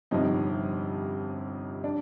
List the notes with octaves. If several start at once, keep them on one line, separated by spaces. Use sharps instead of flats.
G1 F2 C3 F3 D#4
D4